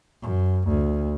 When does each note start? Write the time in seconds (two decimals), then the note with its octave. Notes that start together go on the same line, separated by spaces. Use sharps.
0.22 F#2
0.68 D2